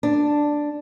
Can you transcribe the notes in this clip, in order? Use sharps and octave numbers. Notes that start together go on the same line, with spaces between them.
D4